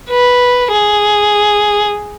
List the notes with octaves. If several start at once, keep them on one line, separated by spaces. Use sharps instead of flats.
B4
G#4